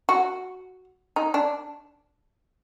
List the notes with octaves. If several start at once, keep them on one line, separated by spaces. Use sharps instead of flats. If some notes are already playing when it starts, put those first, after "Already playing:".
F#4
D#4
D4